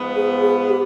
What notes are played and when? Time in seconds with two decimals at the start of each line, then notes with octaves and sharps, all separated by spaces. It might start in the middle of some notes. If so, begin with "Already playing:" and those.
Already playing: G#2 F3 B3
0.16 G#4
0.42 G#4
0.69 G4